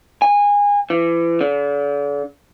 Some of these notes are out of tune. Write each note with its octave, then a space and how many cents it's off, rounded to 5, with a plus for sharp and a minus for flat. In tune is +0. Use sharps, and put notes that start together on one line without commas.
G#5 -25
E3 +30
D3 -40